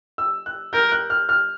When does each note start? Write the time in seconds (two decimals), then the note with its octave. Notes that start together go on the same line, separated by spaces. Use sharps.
0.18 E6
0.46 F#6
0.73 A#4 G6
0.92 F#6
1.10 F6
1.29 F6